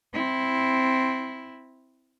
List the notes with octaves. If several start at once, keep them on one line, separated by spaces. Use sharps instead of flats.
C4 E4